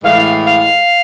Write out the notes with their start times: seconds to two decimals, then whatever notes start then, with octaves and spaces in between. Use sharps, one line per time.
0.02 A2 E3 G#3 F5
0.17 F5
0.44 F5